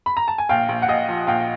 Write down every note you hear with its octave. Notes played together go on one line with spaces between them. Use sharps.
B5
A#5
A5
G#5
A#1 F5 G5
A#1
F#5
A#1 D#5 F5
F3
A#1 F5 G5